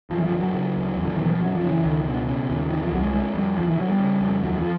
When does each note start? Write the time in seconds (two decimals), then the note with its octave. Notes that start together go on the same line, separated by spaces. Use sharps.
0.10 F#2 F3
0.18 E3
0.24 F3
0.32 D3
0.40 F#3
0.54 C#3
0.75 D2
0.96 E2
1.05 D3
1.14 D#3
1.19 B2 E3
1.31 F3
1.40 F#2 F#3
1.55 F3
1.61 C#3
1.69 E3
1.83 C#2 D#3
2.01 D#3
2.05 B2 D3
2.26 C#3
2.49 D#2
2.70 C3 D#3
2.81 F3
2.91 C2 F#3
3.02 G#3
3.13 D3 G#3
3.34 F2 G3
3.57 D2 F3
3.68 E3
3.78 D3 F#3
3.90 G3
3.99 C#3
4.21 F2
4.43 D#2 F#3
4.58 F3